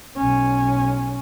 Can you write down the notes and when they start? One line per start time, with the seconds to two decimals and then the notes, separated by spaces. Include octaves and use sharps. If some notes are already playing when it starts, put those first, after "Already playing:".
0.16 B1 C#4